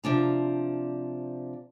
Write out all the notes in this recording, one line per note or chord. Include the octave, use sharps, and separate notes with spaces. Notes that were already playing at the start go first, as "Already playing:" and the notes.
C3 F3 D4 A#5